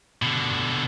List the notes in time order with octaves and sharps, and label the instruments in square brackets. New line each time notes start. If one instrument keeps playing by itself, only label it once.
[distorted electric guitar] B2 D3